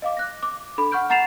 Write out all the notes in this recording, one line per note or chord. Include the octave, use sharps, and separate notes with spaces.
D#5 F5 D6
F#6 A#6
D6
D4 A4 B5
F#5 C#6 F6 G6 D7
F#5 A#5 A6 C7 E7 F7